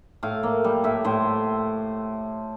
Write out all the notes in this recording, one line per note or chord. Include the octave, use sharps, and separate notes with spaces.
A2 F5
A#3
G3
A2 E5
A2 C5